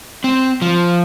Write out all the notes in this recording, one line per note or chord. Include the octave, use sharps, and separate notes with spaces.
C4
F3